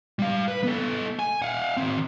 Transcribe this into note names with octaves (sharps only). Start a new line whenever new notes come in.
G3 F5
B4
B3 A4
G#5
F5 F#5
D#3 C4